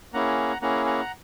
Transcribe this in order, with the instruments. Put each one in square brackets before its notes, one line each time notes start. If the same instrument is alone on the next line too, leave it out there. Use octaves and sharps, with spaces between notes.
[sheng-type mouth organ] A#3 C#4 E4 G#4 F#5 A#5
A#3 C#4 E4 G#4 F#5 A#5
F#5 A#5